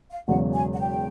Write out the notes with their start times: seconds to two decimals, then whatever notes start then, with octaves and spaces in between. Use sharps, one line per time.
0.11 F5
0.28 E1 E2 C#3 F#3 F#5
0.54 G#5
0.74 F#5
0.80 G5